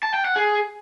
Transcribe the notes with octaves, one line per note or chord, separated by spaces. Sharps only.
A5
G5
F#5
G#4